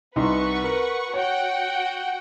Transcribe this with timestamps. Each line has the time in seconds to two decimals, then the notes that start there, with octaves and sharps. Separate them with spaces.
0.16 C2 D#4 B4 F#5 C6 C#6
0.64 A#4
1.14 F#4 C#5 F#5 G5